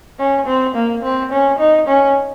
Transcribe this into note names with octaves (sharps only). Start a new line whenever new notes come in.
C#4
C4
A#3
C4
C#4
D#4
C#4